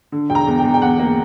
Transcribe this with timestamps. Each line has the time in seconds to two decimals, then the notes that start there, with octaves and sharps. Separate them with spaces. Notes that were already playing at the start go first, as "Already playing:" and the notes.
0.12 D3
0.29 E1 G5
0.35 A#5
0.47 E2
0.58 G5
0.64 E2
0.74 G5
0.82 E2 F#5
1.00 A#3